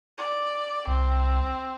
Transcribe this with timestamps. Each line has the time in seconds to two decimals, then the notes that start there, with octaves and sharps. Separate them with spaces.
0.18 D5
0.87 C2 C4